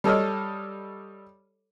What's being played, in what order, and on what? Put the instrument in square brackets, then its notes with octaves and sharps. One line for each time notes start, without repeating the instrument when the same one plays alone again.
[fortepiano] G3 A4 C#5 D#5 E6 F6